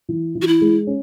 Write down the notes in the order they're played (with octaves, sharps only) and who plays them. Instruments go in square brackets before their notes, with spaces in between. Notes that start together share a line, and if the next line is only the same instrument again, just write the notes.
[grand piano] E3
E3
[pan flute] F#4
E4
[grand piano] G#3
C#4